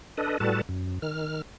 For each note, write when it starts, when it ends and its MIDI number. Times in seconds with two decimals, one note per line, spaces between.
0.17 0.38 62
0.17 0.38 69
0.17 0.38 71
0.17 0.38 75
0.40 0.61 45
0.40 0.61 55
0.40 0.61 66
0.40 0.61 69
0.40 0.61 71
0.40 0.61 81
0.69 0.99 42
1.02 1.42 51
1.02 1.42 89